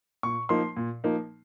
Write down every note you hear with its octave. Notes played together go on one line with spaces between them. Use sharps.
A#2 C#6
F3 A#3 D#4 C6
A#2
F3 A#3 D#4